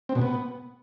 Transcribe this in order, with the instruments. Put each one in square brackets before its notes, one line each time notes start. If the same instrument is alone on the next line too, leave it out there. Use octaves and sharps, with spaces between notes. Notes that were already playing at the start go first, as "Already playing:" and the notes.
[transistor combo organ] C4
B2
B3